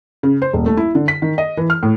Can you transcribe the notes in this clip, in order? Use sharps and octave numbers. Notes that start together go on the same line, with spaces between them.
C#3
C5
D#1
A3
E4
D3
B6
D#3
D#5
E3
F6
A2